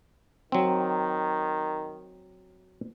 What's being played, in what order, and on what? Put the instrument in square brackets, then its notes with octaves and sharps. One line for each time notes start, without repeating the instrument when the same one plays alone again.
[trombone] D#3 [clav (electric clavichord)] F#3 C4